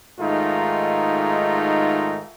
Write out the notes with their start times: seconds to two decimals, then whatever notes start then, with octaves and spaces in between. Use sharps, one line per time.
0.20 G#2 D#3 G#3 A3 D#4 F4